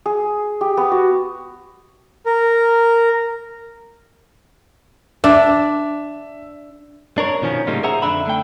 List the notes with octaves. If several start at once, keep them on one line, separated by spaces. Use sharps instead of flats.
G#4
G4
B3
F#4
A#4
D4 E5
D4 A#4 C#5
B2 D#3 F3 C#4
A2 C#3 G3 A#3 D#4 F4
G#4 C5 E5 F#5 A#5
F2 D3 D4 E5 B5
D3 A3 G5